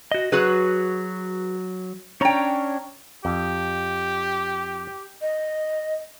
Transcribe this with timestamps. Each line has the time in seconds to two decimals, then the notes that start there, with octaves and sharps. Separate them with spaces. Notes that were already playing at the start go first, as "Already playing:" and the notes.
0.12 F#4 D#5
0.32 F#3 F#4 G#4 B4
2.21 C#4 D4 C#5 G5 A#5
3.25 F2 G4
5.21 D#5